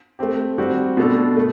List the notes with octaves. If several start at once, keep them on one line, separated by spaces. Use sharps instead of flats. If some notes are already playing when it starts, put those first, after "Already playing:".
A3 C4 G4
G3 C4 F#4
B2 A3 D4 A4
A3